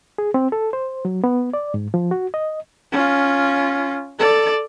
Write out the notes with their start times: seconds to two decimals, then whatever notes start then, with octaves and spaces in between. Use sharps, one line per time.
0.18 G#4
0.34 C4
0.52 A4
0.73 C5
1.05 F#3
1.24 B3
1.53 D5
1.74 G#2
1.94 F3
2.11 F#4
2.34 D#5
2.92 C#4 F4
4.19 A4 D5